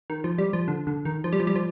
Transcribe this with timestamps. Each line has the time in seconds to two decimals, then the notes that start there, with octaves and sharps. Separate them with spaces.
0.10 D#3
0.24 F3
0.38 G3
0.53 F3
0.68 D3
0.87 D3
1.05 D#3
1.24 F3
1.32 G3
1.40 F3
1.47 G3
1.55 F3